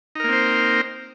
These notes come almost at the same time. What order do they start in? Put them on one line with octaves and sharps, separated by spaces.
D#4 A#4 A#3 C4 C5